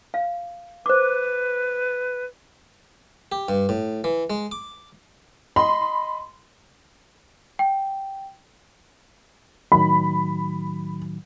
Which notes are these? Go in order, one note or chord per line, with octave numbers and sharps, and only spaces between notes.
F5
B4 C5 D6
G4
G2
A2
E3
G#3
D6
D#5 B5 C6
G5
A2 D#3 F#3 B5